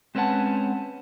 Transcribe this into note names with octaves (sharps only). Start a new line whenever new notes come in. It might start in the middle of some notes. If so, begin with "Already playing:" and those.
G#3 C4 C#4 B4 F#5 A5